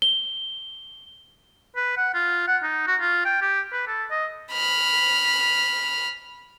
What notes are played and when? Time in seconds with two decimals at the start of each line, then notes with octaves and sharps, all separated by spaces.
0.02 G7
1.76 B4
1.98 F#5
2.15 F4
2.48 F#5
2.63 D#4
2.87 F#4
3.01 F4
3.25 G5
3.42 G4
3.73 B4
3.87 A4
4.11 D#5
4.52 B5 F6